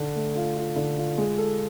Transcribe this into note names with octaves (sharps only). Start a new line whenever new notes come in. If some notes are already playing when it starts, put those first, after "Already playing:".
Already playing: D3
A3
F4
F4
D3
F4
G#3
A4